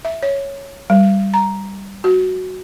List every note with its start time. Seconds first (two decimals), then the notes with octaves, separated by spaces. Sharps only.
0.05 E5
0.23 C#5
0.90 G3
1.34 A#5
2.04 F#4